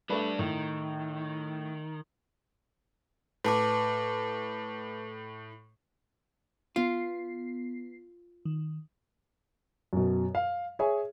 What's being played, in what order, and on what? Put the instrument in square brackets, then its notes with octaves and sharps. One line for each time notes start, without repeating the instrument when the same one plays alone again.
[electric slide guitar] G3 D4 [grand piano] A3 B4
[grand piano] A2 [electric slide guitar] D#3
[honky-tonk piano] A2 [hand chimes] B4 A5 D6
[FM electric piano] B3 C7 [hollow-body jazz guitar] F4
[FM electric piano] D#3
[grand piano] F#2 B2
F5
G#4 C#5 E5 G#5